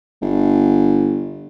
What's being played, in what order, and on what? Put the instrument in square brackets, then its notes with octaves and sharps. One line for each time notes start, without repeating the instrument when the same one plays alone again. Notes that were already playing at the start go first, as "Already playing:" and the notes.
[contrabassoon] G1